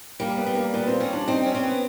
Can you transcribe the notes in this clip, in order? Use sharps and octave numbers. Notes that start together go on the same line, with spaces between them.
G3 A#3
B3
G3
A#3
A#2 B3
C4
G3 C#4
D4
C4 D#4
C#4
C4
B3